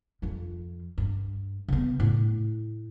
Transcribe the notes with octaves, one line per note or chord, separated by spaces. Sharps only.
F2 F3
G2
C#3 B3
A2